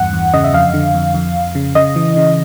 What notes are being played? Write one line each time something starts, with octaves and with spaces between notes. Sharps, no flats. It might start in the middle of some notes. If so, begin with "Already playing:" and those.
Already playing: E2 G2 F#5
E2
C#3 D#5
E5
F2 F5
D3
F2
F2
F2
C#3
C#3 D#5
E3
C#3